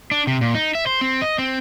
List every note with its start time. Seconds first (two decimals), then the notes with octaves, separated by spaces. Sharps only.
0.11 D4
0.27 C3
0.41 A#2
0.55 D#4
0.75 E5
0.86 C5
1.01 C4
1.22 D#5
1.38 C4